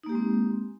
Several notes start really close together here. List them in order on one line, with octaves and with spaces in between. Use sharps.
D#4 A#3 G4 G#3 C4